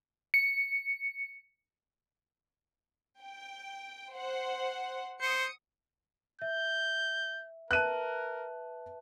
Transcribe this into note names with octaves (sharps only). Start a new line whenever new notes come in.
C#7
G5
C5 F#5
C5 D#6 C#7
E5 G6
A#4 B4 E5 A5 F#6 D#7